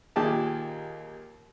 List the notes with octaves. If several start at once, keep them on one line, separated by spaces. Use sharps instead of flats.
D#2 A#2 G4 G#4 A5